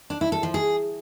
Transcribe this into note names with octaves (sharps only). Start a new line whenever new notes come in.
D4
E4
A4
F3
G#4